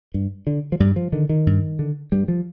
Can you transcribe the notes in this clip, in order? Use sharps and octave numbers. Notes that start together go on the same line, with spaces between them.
G2
D3
F3
G2 G3
F3
D3 D#3
D#3
G2
D3
G2 G3
F3